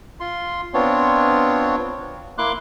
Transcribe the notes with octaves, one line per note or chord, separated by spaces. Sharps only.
F4 C6
B3 C4 D4 F4 C#5
A#3 E4 C6 D6 F#6